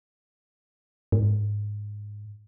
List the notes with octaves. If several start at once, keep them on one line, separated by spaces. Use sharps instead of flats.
G#2